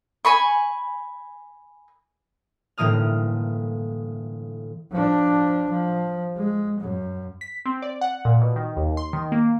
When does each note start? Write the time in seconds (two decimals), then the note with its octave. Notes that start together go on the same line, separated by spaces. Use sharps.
0.25 G#5 B5 C#6
2.78 G1 A2 E3 A#3 D#6 F6
4.91 F3 D4
5.70 F3
6.36 G#3
6.80 F#2
7.41 B6
7.66 C4
7.82 D5
8.01 F#5
8.25 A#2
8.41 B2
8.56 D#3
8.77 D#2
8.97 C6
9.13 D#3
9.32 A#3